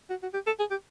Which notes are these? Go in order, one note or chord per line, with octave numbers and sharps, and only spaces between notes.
F#4
F#4
G4
A4
G#4
G4